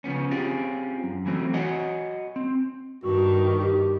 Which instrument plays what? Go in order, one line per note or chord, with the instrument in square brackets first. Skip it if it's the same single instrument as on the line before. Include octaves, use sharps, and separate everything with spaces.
[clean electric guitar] C#3 F3 B3 C#4
C4 C#4 F4 G4 G#4
F#2
E3 F#3 A3 C4
F#4 C#5 D#5 F#5 G#5
C4
[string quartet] G2 D#3 [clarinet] F#4
[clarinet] G4